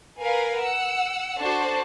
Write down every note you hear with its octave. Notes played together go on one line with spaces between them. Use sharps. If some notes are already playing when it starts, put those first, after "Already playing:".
A#4 B4 F5 G#5
F#5 E6
D4 F#4 A4 C5 A5